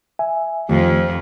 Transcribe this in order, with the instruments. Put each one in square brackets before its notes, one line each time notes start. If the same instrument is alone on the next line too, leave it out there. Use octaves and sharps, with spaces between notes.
[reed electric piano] E5 G#5
[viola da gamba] F2 F3 [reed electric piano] D#3 A3 G4